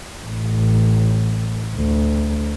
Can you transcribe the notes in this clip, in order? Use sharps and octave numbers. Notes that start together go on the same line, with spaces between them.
A1
D2